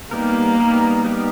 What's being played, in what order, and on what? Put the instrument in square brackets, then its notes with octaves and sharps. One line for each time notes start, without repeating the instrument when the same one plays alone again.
[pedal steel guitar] G3 B3 D#4 G4 A#4 [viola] A#3
[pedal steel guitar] G3 B3 D#4 G4 A#4
G3 B3 D#4 G4 A#4